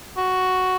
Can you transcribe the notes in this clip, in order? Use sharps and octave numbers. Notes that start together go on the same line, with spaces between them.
F#4